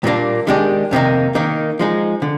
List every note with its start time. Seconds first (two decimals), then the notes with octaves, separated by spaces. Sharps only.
0.04 A#2 G3 A#3 D4
0.47 D#3 G#3 D4 G4
0.91 F2 C3 D#3 A#3 D#4
1.35 D#3 A#3 D#4
1.79 F3 G#3 D#4
2.22 D3